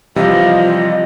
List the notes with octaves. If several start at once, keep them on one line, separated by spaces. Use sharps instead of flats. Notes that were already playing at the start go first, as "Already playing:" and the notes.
C3 E3 F3 G3 D#5 F5